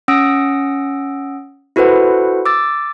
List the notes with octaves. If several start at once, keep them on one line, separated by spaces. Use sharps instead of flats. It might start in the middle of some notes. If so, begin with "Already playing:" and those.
C#4 F#5 D#6 E6 A#6 D7
E4 F#4 A4 B4 C5 F#5
D6 E6 A6